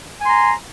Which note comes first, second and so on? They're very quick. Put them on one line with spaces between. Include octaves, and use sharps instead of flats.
G#5 C6 A#5